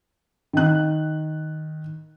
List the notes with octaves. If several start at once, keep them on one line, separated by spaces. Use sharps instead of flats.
D#3 F#6